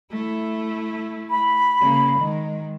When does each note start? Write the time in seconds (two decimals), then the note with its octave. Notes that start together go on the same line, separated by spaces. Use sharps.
0.11 A3 E4
1.30 B5
1.81 C#3 A#3
2.19 D#3 G#3